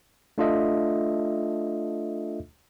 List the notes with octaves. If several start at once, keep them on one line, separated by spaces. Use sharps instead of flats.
A3 D4 F4 A4 D#5 E5